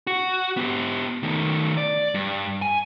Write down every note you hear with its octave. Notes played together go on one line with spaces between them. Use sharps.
F#4
B3 G4
D#3 A3
D5
G2
G#5